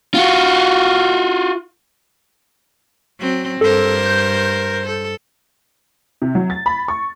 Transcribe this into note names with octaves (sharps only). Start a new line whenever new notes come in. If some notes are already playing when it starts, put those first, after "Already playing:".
F4 F#4
F#3 C4
G2 A4 A#4 C5
G6
A4
C3
F#3
A6
B5
C#6